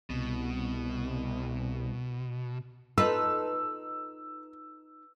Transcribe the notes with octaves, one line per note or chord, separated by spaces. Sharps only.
C2 B2
D#4 F4 A4 B4 E6